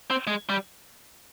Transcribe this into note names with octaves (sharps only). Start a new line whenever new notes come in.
C4
G#3
G3